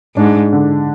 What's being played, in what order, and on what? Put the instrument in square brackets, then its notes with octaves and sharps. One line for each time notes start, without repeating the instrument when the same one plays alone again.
[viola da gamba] G#2 [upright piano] D4
[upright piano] D3